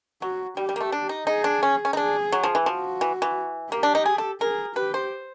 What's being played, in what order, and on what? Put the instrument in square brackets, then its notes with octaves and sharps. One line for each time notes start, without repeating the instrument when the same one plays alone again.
[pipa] F#3 [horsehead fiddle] F#4
[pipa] G3 [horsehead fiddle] G4
[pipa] G3
A#3
A3
D4
D#4
[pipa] D#4 [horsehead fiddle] G#4
[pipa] D4
C#4
C#4
D#4
[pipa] D4 [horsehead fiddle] G#4
[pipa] F#3
F3
E3
[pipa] F3 [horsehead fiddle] F#4
[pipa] E3
E3
[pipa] A#3 [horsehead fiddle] G4
[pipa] D4
D#4
G#4
A4
[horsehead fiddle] G#4 [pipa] A#4
[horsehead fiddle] G4 [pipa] B4
[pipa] C5